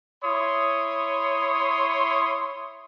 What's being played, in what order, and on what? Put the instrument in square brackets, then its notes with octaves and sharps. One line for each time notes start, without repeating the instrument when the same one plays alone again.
[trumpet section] E4 C#5 C6 D#6